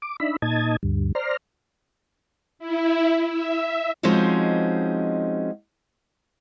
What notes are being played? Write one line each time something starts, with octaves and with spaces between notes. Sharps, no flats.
D6
D4 D#4 E5 B5
A#2 D#4 D#5 A5 G#6
D2 G2
C5 D5 A#5 C6 F6
E4
E5
F3 G#3 C4 C#4 D#4 F#4